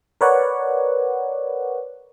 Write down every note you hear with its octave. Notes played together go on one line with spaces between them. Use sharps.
A#4 B4 C#5 D5 F#5